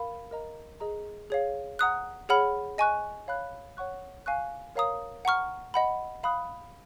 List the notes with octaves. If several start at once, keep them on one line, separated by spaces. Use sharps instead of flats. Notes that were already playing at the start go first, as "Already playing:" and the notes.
Already playing: A#4 F5 B5
A#4 D#5 A#5
G#4 D#5 A#5
G#4 C#5 F5
F#5 A#5 D#6 F#6
G#4 C#5 F#5 B5 F6
D#5 G#5 C#6 F#6
C#5 F5 B5 F#6
C#5 F#5 C#6 F#6
F5 G#5 C#6 F#6
A#4 C#5 F5 A#5 D#6
F#5 A#5 C#6 F6
D#5 F#5 B5
F5 B5 D#6 F#6